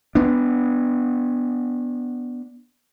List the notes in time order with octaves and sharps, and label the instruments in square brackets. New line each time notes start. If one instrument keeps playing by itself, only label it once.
[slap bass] B3 D4